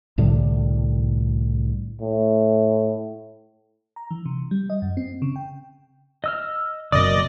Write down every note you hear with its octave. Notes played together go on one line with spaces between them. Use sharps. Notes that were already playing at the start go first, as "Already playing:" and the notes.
C2 A2 D3 G3
A2
A#5
E3
C3
G3
D#5
F#2
C4
C#3
G5
D#5 E6 F6
F#1 B2 A#4 D5 D#5 D6 D#6